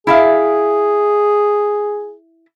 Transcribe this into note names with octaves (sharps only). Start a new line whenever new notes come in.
E4 G#4 E5 F5